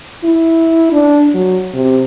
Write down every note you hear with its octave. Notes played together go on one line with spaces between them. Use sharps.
E4
D4
F#3
C3